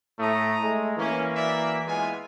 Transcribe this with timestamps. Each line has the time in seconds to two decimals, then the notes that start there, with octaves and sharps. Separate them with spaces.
0.19 A2 A3 A#5 D#6
0.62 G#3 A3
0.98 E3 A#3 C#4
1.35 F#4 D5 E5
1.86 G#3 B3 F4 G#5